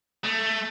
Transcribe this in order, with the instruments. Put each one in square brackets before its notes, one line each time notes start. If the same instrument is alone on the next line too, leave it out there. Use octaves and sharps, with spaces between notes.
[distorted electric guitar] A3